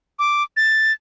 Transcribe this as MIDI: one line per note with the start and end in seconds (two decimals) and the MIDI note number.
0.19 0.43 86
0.57 0.93 93